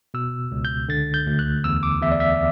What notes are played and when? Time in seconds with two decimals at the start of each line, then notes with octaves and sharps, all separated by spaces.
0.14 B2 E6
0.52 C#2
0.65 G6
0.89 D3 A6
1.14 G6
1.27 D2
1.39 F#6
1.64 E2 E6
1.83 D6
2.02 E2 E5
2.11 D5
2.20 E5